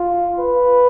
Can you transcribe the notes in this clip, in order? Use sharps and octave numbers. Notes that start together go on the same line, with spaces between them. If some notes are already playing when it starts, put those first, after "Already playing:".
Already playing: F4
B4